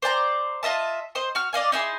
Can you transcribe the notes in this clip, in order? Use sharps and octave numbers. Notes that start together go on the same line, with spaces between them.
C5 D5 A5 A#5
F4 D#5 E5 A5
C5 D#5 C6
F#4 F6
D5 D#5 F5 G#5
D#4 E4 G#4 C6